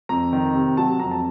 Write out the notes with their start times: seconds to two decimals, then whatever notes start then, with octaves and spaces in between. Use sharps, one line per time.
0.09 F2 A#5
0.33 D#3
0.55 C3
0.77 F#3 A5
1.00 F2 A#5
1.11 A5